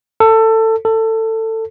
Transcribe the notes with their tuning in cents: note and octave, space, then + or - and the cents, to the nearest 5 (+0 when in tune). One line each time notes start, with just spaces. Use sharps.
A4 +20
A4 +20